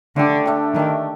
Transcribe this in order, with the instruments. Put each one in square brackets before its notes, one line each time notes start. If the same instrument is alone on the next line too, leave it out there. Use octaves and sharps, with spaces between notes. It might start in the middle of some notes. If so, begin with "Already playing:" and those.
[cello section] D3 [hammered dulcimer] A3 D4 G4
[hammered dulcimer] A3 D4 G4
[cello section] D#3 [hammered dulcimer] A3 D4 G4